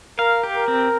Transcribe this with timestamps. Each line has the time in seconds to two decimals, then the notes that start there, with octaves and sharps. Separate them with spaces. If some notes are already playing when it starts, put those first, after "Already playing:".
0.19 A#4 F5
0.43 G4
0.55 A#4
0.68 C4